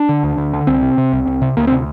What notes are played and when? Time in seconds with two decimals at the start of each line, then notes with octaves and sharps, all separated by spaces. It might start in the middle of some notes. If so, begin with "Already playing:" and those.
Already playing: D4
0.09 D3
0.23 D2
0.37 D2
0.53 D3
0.67 C2 C4
0.82 C3
0.98 C3
1.13 C2
1.27 C2
1.42 C3
1.57 D2 A#3
1.67 C4
1.72 C3